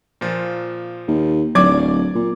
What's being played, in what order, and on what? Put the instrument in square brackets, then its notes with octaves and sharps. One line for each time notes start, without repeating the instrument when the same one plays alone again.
[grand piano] A#2 F3
[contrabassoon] D#2
[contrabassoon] D1 [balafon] F#3 [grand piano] D5 D6 G#6
[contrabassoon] A#2